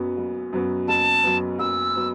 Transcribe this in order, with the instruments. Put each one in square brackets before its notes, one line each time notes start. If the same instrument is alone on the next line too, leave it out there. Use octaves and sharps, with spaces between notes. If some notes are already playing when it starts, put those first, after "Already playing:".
Already playing: [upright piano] F#1 F#2 F#3 B3
F#1
F#2 F#3 B3
[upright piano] F#1 [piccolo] A5
[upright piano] F#2 F#3 B3
[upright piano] F#1 [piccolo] E6
[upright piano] F#3 B3